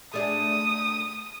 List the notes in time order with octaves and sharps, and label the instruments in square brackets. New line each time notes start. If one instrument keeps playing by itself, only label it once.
[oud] A3 D4 G#4 [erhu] D#6